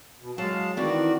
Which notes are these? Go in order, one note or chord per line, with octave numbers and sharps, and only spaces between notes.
B2
F#3 G#3 F5 A5
D#3 E3 C4 F#4 D5